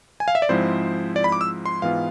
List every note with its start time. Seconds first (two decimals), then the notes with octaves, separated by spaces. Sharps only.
0.20 G#5
0.28 F5
0.35 E5
0.42 D5
0.49 G#2 F3 G#3 C4 E4 C5
1.16 D5
1.24 B5
1.32 D6
1.41 E6
1.66 C6
1.82 G#2 E3 B3 F4 F5